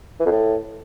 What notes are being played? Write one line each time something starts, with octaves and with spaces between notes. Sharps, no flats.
E3
F2
A2